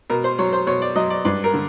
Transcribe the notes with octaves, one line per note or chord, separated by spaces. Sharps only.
B2 A#4
C5
F#3 C#5
C5
B2 C#5
D5
F#3 D#5
D5
G2 D5
A#4
D3